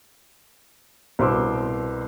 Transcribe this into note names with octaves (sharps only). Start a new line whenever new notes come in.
C2 B2 C5 C6 D6 E6